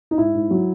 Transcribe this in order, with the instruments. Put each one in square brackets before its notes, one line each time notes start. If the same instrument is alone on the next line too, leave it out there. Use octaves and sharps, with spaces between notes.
[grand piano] D#4
G#2 E4
G#2
F#3